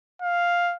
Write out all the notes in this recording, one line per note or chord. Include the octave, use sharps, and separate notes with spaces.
F5